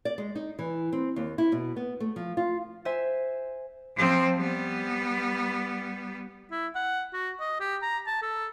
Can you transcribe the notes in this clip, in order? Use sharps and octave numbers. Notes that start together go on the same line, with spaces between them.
D5
G#3
D#4
E3
C4
D#2
E4
B2
B3
A3
F3
F4
C5 E5 G#5
F3 C4
G3 B3
E4
F#5
F#4
D#5
G4
A#5
A5
A4